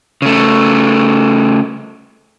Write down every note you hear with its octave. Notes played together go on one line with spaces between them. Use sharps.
C#3 A3